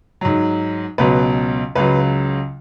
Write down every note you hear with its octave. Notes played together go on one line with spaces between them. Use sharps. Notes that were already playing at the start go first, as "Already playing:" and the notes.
G#2 F#3
C#2 B2 F#3 B4
C#2 C#3 F#3 B4